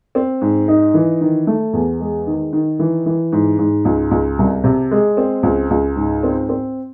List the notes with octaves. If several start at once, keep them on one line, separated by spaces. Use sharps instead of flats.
C4
G#2
D#4
E3
D#3
A3
E2
G#3
D#3
D#3
E3
E3
G#2
G#2
C#2
C#2
C2
C3
G#3
C4
C#2
C#2
G#2
C4
C4